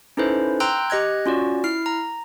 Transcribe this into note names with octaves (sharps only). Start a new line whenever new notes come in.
C#4 D#4 E4 A4 B4 C5
G5 A#5 C6 E6 F#6 G6
G4 D#5 F#6 G#6
C#4 F4 F#4 D5
E4 F6 C7
A#5